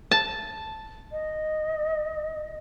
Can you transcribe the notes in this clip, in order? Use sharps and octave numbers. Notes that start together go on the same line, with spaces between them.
A5
D#5